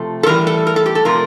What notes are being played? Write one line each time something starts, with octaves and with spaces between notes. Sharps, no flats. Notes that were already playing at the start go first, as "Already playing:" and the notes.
Already playing: C3 F3 A3
A4
A2 E3 G3 A#4
A4
A#4
A4
G4
A4
C3 F3 A3 A#4